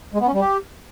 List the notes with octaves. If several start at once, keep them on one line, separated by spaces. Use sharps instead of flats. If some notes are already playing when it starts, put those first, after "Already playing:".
G#3
B3
C#4
G3
G4